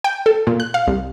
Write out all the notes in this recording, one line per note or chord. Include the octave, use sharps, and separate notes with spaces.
G5
A4
A#2
F#6
F5
C2